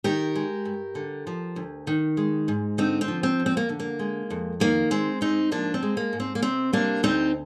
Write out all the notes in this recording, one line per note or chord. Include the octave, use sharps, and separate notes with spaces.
D#3 G4 A#4
G#3
G2
D3
F3
D2
D#3
G#3
G#2
D3 C4 D#4
C4
F3
C4
F2
C4
A#3
D3
A#3
G#3
F2
D#3 A#3
G#3 C4
G#2 C4 D#4
F3 A#3 D4
C4
G#3
A#3
G#2
C4
A#3
C3 C4
G3 A#3 D4
D2 C4 D#4